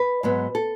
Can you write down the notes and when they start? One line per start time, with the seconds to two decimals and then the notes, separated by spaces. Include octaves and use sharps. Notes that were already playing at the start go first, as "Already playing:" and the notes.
Already playing: B4
0.23 G#2 F#3 B3
0.55 A4